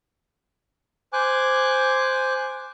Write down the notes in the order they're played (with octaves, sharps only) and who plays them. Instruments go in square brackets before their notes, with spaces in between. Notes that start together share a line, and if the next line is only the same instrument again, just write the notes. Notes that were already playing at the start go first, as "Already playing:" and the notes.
[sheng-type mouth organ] C5 G#5 D6 F#6